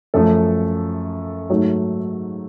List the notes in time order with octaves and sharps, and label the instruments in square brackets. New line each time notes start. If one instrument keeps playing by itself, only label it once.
[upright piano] F#2 F3 A3 A4
G#2 F#3 A3